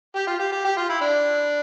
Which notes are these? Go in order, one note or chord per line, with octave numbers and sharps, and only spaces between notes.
G4
F4
G4
G4
G4
F4
E4
D4